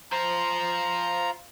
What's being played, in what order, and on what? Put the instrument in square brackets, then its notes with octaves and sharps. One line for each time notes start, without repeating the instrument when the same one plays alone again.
[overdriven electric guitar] F4 C5 [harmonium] A#5